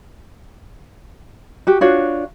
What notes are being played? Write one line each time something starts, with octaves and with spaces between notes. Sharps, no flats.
F#4 G4
D4 F4 F#4 C#5